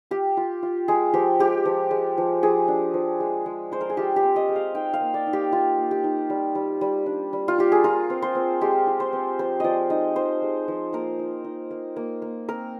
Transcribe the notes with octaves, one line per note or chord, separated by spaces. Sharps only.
F4 G4
F4
F4
G#3 G#4
F3 G4
G#3 G4
F3
G#3
F3
F3 G#4
D4
F3
G#3
G#3
G#3 C5
A#4
G#4
F4 G4
G4
C4
D#5
G#3
F5
D#4 G5
F5
A#3
D5
D#4
G4
D#4 F4
A#3
G4
D#4
G3
G3
G3
D4
G3
F4
F4 G4
G#4
F4 A#4
C4
C5
C4
G#3 G4
F4
C5
C4
F3 C5
F3 D5 D#5
D#4 D#5
F3 C5
G#3
F3
A#3 A#4
D#4
D#4
A#3
A#3
A#3
C4 A#4